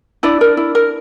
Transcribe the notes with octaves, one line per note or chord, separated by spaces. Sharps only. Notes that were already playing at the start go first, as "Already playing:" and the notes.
D4 E4 D5
A#4
E4
A#4